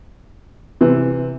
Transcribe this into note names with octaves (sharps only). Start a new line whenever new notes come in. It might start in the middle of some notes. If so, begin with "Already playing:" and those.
C3 E3